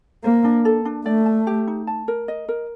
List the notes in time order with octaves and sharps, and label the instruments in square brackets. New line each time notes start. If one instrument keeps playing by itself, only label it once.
[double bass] A#3 [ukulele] C5
[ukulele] D4
A4
D4
[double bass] A3 [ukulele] D5
[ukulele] A5
G4
D#4
A5
A#4
D#5
A#4